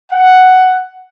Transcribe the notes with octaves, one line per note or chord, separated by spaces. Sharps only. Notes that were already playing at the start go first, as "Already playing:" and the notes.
F#5